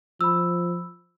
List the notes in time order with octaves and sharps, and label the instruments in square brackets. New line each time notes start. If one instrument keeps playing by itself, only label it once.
[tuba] F3 [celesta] B5 E6